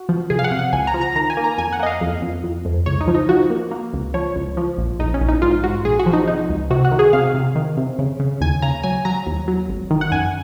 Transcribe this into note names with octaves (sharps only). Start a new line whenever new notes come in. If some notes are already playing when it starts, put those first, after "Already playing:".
Already playing: F#4
F3
C3 G#4
F5
F#5
C3
F#5
C#2 G#5
A#5
F3
A#5
D#3 A#5
G#5
A#3
A#5
F2 G#5
F#5
A#3 D#5
F5
F2
F2
F2
F2
C#2 C#5
D#4
F3
D#4
F3 F#4
A#3
A#3
C#2
F3 C#5
C#2
F3
A#1
A#1 D#4
C#4
A#1
D#4
G#2 F4
G#2 F#4
A#1 G#4
F#4
F3
D#4
C3 D#4
C#2
C3 F#4
F#4
D#3
G#4
C3 F5
C3
D#3
C3
C#3
C#3
D#2 G#5
C#3 A#5
F#3 G#5
F#3 A#5
D#2
F#3
G#1
D#3
F#5
F#2 G#5